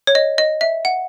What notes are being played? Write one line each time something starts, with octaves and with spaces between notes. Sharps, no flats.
C#5
D#5
D#5
E5
F#5